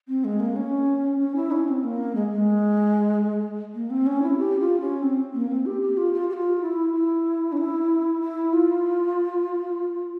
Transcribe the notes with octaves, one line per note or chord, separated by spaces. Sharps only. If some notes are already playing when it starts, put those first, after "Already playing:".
C4
G#3
A#3
C#4
C#4
E4
C#4
C4
A#3
G#3
G#3
A#3
C4
C#4
E4
G4
F4
C#4
C4
A#3
C4
G4
G4
F4
F4
G4
F4
E4
E4
C#4
E4
E4
F4